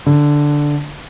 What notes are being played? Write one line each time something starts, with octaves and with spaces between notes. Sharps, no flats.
D3